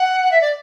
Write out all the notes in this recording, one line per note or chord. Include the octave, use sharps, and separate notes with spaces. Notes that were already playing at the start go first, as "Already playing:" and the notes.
Already playing: F#5
E5
D5